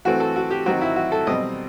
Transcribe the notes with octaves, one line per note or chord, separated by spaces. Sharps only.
E3 A3 C4 F#4
A4
F#4
G4
D#3 F#3 C4 F#4
E4
F#4
A4
B2 G3 C4 D#5